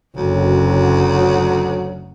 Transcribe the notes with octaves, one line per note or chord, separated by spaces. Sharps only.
F#1 D2 F#3